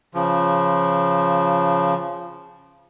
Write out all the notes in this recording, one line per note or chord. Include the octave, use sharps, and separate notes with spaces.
C#3 F3